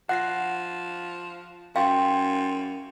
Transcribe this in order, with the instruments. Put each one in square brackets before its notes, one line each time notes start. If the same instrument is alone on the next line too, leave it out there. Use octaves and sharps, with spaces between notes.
[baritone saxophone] F3 [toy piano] F#5 [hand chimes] F#6 A#6 C7
[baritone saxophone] F#2 [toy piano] F5 [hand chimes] G5 C6 C#6